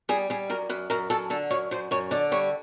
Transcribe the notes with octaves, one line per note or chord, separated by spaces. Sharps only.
G3 G#4
G3 G#4
F#2 A#4
F#2 B4
F#2 A#4
F#2 A4
D3 A4
F#2 C#5
F#2 C5
F#2 C#5
D3 D5
G3 C#5